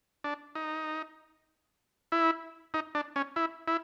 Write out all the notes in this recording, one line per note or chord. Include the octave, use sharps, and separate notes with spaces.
D4
D#4
E4
D#4
D4
C#4
E4
E4